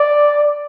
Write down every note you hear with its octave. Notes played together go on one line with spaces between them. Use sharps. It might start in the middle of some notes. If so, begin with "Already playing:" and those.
Already playing: D5